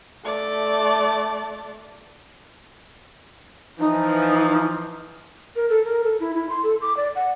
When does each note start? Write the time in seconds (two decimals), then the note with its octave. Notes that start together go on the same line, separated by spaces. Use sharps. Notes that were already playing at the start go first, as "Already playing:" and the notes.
0.24 A3 D5
3.79 E3 F3 D#4
5.56 A#4
5.70 A4
5.85 A#4
6.04 A4
6.20 E4
6.35 E4
6.50 C6
6.63 A4
6.81 D6
6.97 D5
7.16 F#5